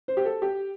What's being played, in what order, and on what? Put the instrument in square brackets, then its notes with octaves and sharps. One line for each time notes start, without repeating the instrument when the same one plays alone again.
[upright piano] C5
G4
A4
G4